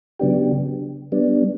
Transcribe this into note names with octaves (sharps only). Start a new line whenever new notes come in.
C#3 F#3 B3 D4 G4
G3 B3 D4